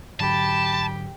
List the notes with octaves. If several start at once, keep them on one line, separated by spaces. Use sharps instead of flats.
G#2 D3 F#3 G4 A5 B5